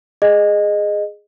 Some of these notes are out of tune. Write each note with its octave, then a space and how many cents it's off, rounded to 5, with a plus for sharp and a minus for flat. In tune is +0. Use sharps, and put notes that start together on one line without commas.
G#4 +0 D#5 -15